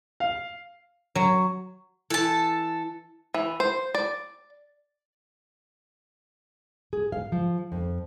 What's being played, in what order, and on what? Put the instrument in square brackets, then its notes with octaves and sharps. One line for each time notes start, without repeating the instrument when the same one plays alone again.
[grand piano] F5
[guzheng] F#3
[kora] E3 [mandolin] A4 A5
[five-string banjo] E3
C5
D5
[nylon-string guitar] G#4
F5
F3
F2